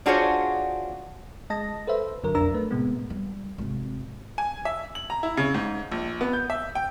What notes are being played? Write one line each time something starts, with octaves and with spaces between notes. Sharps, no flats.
D4 F4 F#4 G#4 C5 C#5
G#3 D#5 A5 A#6
A4 B4 C5 E5
G1 D3 F#3 A#4
B1 F2 D4 A#4 A#5 E6
A3 B4
A2 C3 G#3 B3
G3
G#1 C3
G#5
E5
F#7
A#5
E4
C#3
G#2
A#1
B3
G6
E5
G5